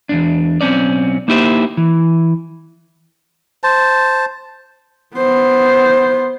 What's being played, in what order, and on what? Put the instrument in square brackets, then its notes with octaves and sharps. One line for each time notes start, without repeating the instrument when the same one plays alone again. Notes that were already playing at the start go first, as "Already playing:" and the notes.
[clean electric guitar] E2 G#2 D4
B1 E2 C4 C#4 D5
A#3 D#4 E4 G4 B4 C5
E3
[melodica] C5 A5
[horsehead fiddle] B3 C5